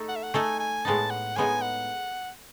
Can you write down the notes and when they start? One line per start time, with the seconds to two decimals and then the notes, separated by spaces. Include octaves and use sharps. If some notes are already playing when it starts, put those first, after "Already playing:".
Already playing: A3 D#4 A4
0.08 F#5
0.16 E5
0.23 F#5
0.34 A3 D#4 A4 G#5
0.59 G#5
0.85 A2 G#3 B3 D#4 A5
1.10 F#5
1.36 A2 G#3 B3 D#4 G#5
1.62 F#5